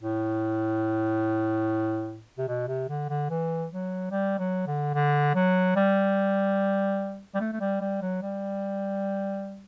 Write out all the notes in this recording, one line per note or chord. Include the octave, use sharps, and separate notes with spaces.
A2
C3
B2
C3
D3
D3
E3
F#3
G3
F#3
D3
D3
F#3
G3
G3
A3
A3
G3
G3
F#3
G3